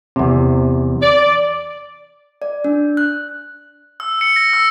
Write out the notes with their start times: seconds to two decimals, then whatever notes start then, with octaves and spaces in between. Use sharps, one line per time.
0.16 E2 C3
1.01 D5
2.42 D5
2.64 D4
2.97 F#6
4.00 E6
4.21 C#7
4.36 A#6
4.53 E6